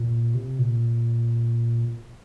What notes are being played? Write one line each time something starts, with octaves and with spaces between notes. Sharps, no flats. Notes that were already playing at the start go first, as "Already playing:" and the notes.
Already playing: A#2
C3
A#2